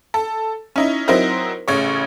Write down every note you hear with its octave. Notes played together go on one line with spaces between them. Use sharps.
A4
C#4 D#4 E4
F#3 C4 D#4 E4 A#4 C5
A1 C#3 C#5